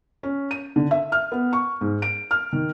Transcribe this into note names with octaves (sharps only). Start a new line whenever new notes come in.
C#4
D#7
D3
E5
F6
B3
C#6
G#2
D7
F6
D#3